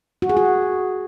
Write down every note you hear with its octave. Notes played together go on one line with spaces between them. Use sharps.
F#4
G#4
F#4